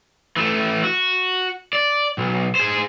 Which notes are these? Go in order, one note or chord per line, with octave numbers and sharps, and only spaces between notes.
E3 A3
F#4
D5
B1
G#4 C5